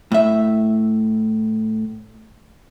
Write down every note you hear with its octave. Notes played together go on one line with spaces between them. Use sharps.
A2 E5